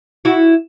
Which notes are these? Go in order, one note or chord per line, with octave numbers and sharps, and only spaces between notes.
E4 F#4